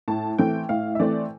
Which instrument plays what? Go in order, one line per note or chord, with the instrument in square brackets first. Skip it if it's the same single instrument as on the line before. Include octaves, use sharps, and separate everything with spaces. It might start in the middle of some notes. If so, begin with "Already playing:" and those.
[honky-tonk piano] A2 A5
E3 A3 C4 G5
A2 F5
E5
E3 A3 C4 D5